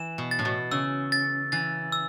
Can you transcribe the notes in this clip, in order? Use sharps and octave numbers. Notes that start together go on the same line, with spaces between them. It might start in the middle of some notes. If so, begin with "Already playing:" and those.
Already playing: E3 E7
B2
A6
A2
B2
C#3 E6
A6
E3 A6
E6